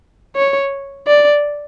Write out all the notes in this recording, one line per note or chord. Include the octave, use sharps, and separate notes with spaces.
C#5
D5